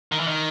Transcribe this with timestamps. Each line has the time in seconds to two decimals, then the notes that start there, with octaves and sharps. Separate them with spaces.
0.12 D#3
0.20 E3
0.28 D#3